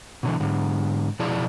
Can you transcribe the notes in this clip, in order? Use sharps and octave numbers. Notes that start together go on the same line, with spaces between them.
B2 D3 E3
G#2 D3
B2 F3 E4 G#4 D5 A5